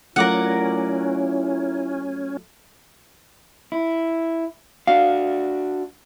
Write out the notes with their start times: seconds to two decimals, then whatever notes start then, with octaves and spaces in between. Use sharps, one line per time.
0.16 F#3 A3 C#4 E4 F4 A#4 D5 F#5
3.72 E4
4.87 D4 F#4 F5